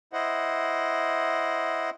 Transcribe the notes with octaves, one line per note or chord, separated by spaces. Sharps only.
E4 C5 D#5 F#5